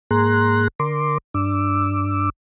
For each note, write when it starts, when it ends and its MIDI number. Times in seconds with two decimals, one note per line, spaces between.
0.11 0.68 44
0.11 0.68 58
0.11 0.68 68
0.11 0.68 82
0.11 0.68 84
0.11 0.68 90
0.79 1.18 50
0.79 1.18 70
0.79 1.18 84
0.79 1.18 86
1.34 2.30 43
1.34 2.30 62
1.34 2.30 86
1.34 2.30 88